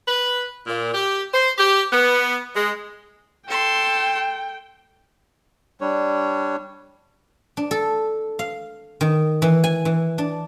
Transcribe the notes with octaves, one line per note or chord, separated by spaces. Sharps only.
B4
A#2
G4
C5
G4
B3
G#3
A4 G5 C6
G3 D4 C#5
D4
A4
F5
D#3
E3
G#5
E3
D4